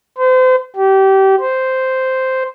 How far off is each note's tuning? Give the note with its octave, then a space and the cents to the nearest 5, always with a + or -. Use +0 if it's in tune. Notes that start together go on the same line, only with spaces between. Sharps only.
C5 -35
G4 -25
C5 -5